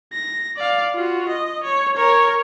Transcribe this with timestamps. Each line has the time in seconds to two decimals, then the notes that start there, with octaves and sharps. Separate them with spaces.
0.13 A#6
0.57 D5 F5
0.94 F4 F#4
1.28 D#5
1.64 C#5
1.97 A#4 C#5